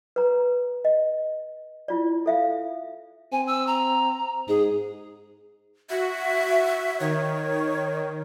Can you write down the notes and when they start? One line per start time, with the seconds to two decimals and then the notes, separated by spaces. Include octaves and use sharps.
0.16 B4 A#5
0.85 D#5
1.88 E4 F4 D5
2.26 A4 E5 F5
3.32 C4 G#5
3.47 E6
3.67 A#5
4.48 G#2 G#4
5.90 F#4 E5
7.00 D#3 C#5